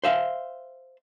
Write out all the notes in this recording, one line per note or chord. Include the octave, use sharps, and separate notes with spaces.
C5 E5 F5